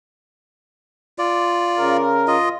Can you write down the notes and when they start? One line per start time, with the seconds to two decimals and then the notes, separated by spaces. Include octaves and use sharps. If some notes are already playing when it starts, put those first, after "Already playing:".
1.18 F4 D5
1.77 C#3 A#4
2.28 F4 D#5